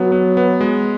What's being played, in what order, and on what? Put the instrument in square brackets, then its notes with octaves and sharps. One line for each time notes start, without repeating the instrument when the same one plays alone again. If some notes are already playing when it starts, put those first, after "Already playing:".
Already playing: [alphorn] F#3 [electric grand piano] B3
[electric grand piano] B3
B3
G#3